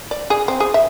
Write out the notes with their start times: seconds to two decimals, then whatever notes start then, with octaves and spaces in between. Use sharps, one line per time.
0.11 D5
0.30 G#4
0.48 C4
0.60 G#4
0.74 E5